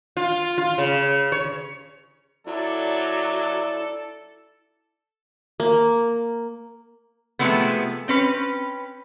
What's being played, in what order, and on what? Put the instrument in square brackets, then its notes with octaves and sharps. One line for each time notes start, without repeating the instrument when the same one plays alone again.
[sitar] F4
F4
C#3
C#5
[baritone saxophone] F#3 [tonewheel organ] E4 [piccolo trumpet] A4 [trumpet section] D5
[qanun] A#3
[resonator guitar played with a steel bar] C3 F3 G#3 A3 B3
C4 C#4 B4